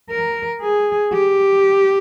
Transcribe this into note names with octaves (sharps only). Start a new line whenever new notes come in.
A#4
G#4
G4